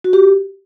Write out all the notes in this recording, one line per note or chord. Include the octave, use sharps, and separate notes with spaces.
F#4
G4